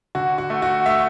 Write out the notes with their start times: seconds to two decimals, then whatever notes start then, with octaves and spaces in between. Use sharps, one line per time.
0.15 D3 F#4
0.38 F#4
0.50 A3
0.62 F#4
0.86 A3 E5